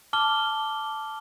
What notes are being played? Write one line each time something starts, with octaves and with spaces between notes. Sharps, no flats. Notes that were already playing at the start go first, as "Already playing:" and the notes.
A5 D6 F6 G7